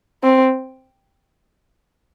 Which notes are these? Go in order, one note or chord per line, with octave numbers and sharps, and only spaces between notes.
C4